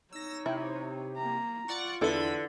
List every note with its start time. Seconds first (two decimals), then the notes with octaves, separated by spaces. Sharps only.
0.13 D#4 C#5 E6 A#6
0.46 C3 E4
1.17 A#3 A#5
1.68 F4 D5 F#5 C#6
2.01 E2 D3 B3 E4 A4 B5